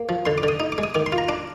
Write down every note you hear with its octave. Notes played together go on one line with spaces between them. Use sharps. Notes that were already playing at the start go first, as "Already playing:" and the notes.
Already playing: A#3
F3
D3 C6
D6
D3
D#6
D#4
D6
G#3
D#6
D#3 D6
C6
F4
A#5
D4 D6